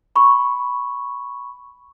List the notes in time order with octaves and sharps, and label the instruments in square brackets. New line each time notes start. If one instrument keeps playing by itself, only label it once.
[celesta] B5 C#6